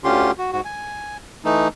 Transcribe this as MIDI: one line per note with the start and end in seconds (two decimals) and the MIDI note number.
0.04 0.31 38
0.04 0.31 50
0.04 0.31 61
0.04 0.31 65
0.04 0.31 67
0.04 0.31 84
0.38 0.51 66
0.52 0.61 44
0.52 0.61 66
0.65 1.17 80
1.45 1.68 52
1.45 1.68 57
1.45 1.68 63